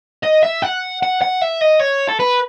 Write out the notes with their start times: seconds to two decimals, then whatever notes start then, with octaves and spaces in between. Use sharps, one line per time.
0.24 D#5
0.43 E5
0.62 F#5
1.03 F#5
1.22 F#5
1.42 E5
1.61 D#5
1.80 C#5
2.08 A4
2.19 B4